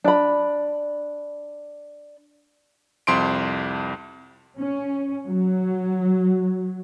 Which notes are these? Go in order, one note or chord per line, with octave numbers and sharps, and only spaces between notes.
D4 B5
C2 F2 C6 D7
C#4
F#3